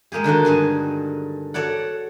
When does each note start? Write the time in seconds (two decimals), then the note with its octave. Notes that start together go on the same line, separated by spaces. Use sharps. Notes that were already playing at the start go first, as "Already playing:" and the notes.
0.12 G#3 A#3 G4 G#4
0.24 D3 D#3 D4 F#4
0.45 G2 G#4 G#5
1.54 F#4 A4 C#5 D5 F#5